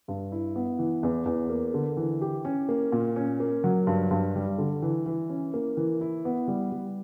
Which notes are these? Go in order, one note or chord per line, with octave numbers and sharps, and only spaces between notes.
G2
E4
B3
E3
E2
E2
A#3
D3
E3
G4
C#4
A#3
A#2
C#4
A#3
F#3
G2
G2
G3
D3
E3
E3
C#4
A#3
E3
E4
B3
G3
G3